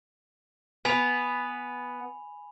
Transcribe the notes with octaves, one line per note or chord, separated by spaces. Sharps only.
B3 G#5 B5 F7